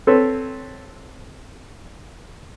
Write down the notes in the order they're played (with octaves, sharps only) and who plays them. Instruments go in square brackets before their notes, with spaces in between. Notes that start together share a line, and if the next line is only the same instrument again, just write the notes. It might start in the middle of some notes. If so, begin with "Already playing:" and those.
[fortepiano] C4 A4 B4 C#5